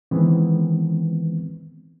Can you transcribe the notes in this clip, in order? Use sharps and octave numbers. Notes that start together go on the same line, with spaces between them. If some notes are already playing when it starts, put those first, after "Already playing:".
D#3 E3 G#3 B3 C4